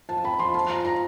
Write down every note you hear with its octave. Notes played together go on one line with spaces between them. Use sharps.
F3 A5
C4 B5
F3 C6
F4 A5
G#3 A#5
F4 A#5